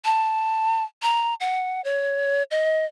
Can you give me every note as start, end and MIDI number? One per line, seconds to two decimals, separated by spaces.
0.05 0.83 81
1.02 1.34 82
1.40 1.81 78
1.84 2.43 73
2.51 2.85 75